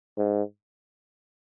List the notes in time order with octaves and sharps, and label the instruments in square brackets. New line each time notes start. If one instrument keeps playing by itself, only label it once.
[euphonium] G#2